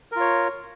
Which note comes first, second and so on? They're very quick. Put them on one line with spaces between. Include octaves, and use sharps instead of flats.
A#4 F4 C#5